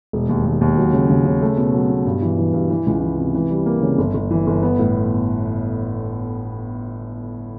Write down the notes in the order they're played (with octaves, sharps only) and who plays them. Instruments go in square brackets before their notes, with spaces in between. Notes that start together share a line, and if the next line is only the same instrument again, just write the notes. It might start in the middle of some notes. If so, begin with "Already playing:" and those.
[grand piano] E1
D#2
D#2
D#2
F#3
C#3
C#3
C#3
A3
B2
F#3
B2
G2
E3
E3
G2
E3
C#2
E3
C3
E3
G3
A#3
C#3
G1
G1
E3
G1
B3
A2